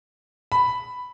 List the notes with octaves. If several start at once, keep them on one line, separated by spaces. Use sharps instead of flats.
B5